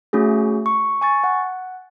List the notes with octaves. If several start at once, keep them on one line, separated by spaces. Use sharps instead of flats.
A3 C#4 F#4 G#4
C#6
G#5 C#6 A6
F#5